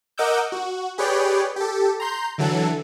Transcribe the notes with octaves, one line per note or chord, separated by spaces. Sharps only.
A#4 D#5 F#5 D6 E6 G6
F#4
G4 G#4 B4 C#5 D5 G5
G4 A4
A#5 C6 G6
D3 E3 F#3 A4